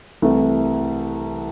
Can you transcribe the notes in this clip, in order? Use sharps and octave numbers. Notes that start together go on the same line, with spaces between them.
C2 C3 E3 A3